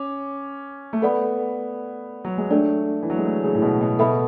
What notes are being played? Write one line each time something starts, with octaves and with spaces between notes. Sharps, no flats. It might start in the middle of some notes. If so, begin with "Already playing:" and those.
Already playing: C#4 D6
A3
B3 A4 D5 F#5 B5
F#3
G#3
A3 D4 A4 D5
E3
F#3
G#3
A3
C#3
A2
B2
B2
B2 A4 E5 B5